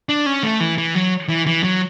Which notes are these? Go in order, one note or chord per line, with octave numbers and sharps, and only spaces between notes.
D4
C#4
A3
E3
E3
F#3
E3
E3
F#3